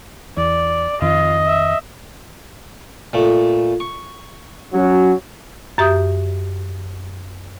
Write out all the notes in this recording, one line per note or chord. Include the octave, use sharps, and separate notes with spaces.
E2 D5
F2 D#3 F4 D#5
E5
A#2 A3
C#6
F#3 C#4
F#2 G4 E5 D#6 G6